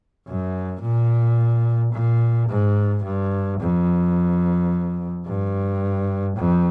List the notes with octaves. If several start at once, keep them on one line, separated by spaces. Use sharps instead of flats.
F#2
A#2
A#2
G#2
G2
F2
G2
F2